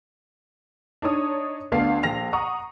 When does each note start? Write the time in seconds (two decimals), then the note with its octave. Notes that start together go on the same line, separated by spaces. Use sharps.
1.02 D4 D#4 C#5 D#6
1.72 D2 B3 D4 F5 C7
2.03 A#1 G5 A#6 F7
2.33 F#5 A#5 C#6 D#6